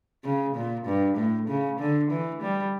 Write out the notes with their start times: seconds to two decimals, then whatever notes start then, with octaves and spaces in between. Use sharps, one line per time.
0.24 C#3
0.55 A#2
0.86 G2
1.17 A2
1.48 C#3
1.79 D3
2.11 E3
2.42 G3